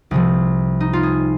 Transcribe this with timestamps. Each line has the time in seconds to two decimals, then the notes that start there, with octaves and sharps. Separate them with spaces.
0.11 C2 C3 F3
0.80 D#4
0.93 F4
1.03 G#4